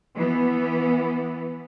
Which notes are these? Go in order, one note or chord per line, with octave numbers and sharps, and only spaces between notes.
E3 B3